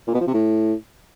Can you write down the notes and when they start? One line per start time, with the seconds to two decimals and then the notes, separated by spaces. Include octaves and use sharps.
0.08 A#2
0.14 B2
0.21 F3
0.27 C3
0.34 A2